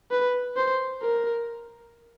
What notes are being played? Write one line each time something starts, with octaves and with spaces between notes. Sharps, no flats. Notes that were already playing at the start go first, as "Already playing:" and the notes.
B4
C5
A#4